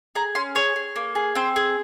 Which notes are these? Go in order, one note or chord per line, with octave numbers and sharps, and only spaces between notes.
G#4 A#5
C#4 C6
G#4 C#5
G#4
A#3
G#4
C4 C5
G#4